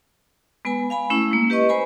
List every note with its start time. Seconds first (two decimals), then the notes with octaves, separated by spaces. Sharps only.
0.65 G#3 B3 B4 G#5 B5
0.90 F5 G#5 B5
1.10 A3 C#4 E4
1.31 G#3 A#3
1.50 G4 B4 D#5 C#6
1.69 B4 C5 G#5 B5